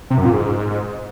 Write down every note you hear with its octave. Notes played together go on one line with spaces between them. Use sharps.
C3
F#2
A#2
G#2